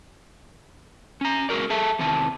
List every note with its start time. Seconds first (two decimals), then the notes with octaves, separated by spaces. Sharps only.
1.21 C#4 A#5
1.49 G#3 A#3 F#4 A#4 D5
1.70 G#4 A4 E5 A5
1.99 E2 C3 D#3 E3 A5